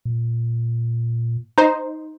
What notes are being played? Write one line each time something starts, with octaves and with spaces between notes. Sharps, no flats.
A#2
D#4 C5